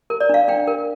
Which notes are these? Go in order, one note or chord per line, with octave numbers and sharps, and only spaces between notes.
A#4
D5
D4 F5
D4 G5
A#4